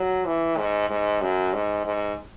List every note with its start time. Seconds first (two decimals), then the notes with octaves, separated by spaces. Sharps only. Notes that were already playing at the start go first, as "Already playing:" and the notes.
Already playing: F#3
0.26 E3
0.58 G#2
0.90 G#2
1.22 F#2
1.54 G#2
1.85 G#2